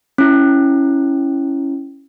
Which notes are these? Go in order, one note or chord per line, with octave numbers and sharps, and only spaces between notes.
C#4 E4